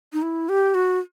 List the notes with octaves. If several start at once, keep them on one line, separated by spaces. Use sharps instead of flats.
D#4
E4
G4
F#4